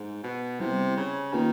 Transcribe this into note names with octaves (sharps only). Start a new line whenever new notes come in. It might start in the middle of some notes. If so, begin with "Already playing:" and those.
Already playing: G#2
B2
C3 G3 B3 E4 G4
C#3
D#3 A#3 C#4 F4 G#4 B4